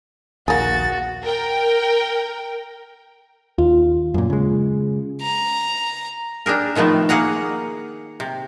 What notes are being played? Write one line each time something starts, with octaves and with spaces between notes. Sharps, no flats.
A#1 D#2 A#3 F#4 G#4 A6
A#4 G5
D#2 F4
F#2 A#2
C#3 G#3
A#5
D4 G4 G#4 A#4
C3 D#3 F3 A3 B3
A#3 G#4 F#5 A#5
C3